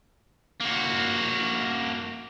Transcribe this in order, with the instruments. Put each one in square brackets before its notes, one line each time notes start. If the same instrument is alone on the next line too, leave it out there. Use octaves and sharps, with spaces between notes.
[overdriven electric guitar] A#3 F#4